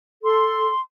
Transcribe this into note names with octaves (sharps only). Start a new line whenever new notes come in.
A4 C6